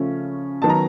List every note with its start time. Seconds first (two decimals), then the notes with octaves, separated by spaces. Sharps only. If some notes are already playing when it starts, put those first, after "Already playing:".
Already playing: C#3 F3 A3 C#4
0.62 D#3 F#3 B3 D#4 A5
0.69 A#5